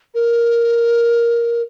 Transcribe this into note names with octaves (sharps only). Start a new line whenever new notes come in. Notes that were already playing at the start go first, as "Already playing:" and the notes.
A#4